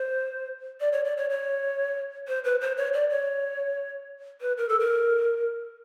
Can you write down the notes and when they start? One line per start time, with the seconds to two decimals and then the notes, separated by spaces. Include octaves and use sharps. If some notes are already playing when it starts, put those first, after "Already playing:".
Already playing: C5
0.80 D5
0.92 C#5
1.05 D5
1.17 C#5
1.30 C#5
2.28 C5
2.44 B4
2.61 C5
2.77 C#5
2.94 D5
3.10 C#5
4.41 B4
4.57 A#4
4.69 A4
4.79 A#4